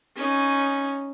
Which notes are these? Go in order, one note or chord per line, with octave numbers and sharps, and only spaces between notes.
C#4 D#4